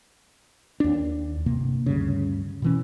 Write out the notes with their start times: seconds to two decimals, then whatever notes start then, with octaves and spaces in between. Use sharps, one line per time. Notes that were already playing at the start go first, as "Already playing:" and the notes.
0.80 D#2 D4
1.46 G1 C3 A#3
1.86 D2 G2 C#3
2.62 B2 E3 C#4